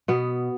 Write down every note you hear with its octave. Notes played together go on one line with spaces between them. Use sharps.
B2 B3